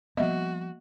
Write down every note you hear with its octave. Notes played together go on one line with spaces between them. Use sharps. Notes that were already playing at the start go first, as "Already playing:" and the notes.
F3 G3 A#3 B3 F#4 D#5 E5